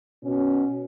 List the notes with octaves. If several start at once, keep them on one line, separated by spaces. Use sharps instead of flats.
B2 C#4